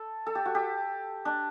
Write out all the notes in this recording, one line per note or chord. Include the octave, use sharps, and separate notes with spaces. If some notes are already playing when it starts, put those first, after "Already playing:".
Already playing: A4
A4
G4
F#4
G4
D4